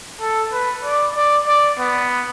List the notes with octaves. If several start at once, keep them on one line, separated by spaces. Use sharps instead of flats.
A4
B4
D5
D5
D5
B3